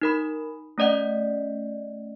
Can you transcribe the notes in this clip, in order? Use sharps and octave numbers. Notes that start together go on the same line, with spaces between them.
D#4 A#4 B5
A3 C#4 D5 D#5 F#5